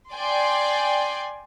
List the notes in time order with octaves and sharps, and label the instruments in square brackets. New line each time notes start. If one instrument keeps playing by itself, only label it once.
[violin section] D5 G5 G#5 C6